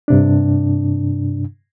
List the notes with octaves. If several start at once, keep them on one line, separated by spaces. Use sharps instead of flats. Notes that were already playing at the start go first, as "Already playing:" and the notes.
G2 C3 D4